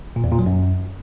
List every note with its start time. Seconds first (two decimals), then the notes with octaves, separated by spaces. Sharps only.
0.16 A#2
0.24 E2
0.31 A#2
0.39 F#3
0.46 F#2